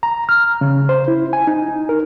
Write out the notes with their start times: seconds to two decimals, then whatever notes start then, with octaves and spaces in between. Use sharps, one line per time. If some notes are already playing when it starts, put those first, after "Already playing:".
0.03 A#5
0.29 F6
0.61 C#3
0.89 C5
1.08 E4
1.33 G#5
1.47 D#4
1.89 A#4